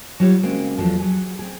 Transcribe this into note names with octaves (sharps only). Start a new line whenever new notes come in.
F#3 G3 F4 G4 C#5
C#3 G#3 A#3 C4 F#4
E2 F3 F#3 G#3 A4
F#3 G#4
C4 G#4